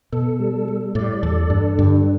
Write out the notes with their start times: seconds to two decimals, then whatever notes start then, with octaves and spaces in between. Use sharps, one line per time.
0.12 B2 A4
0.40 G3
0.68 G3
0.95 A2 D5
1.23 E2 A4
1.50 G2 D4
1.77 G2 D3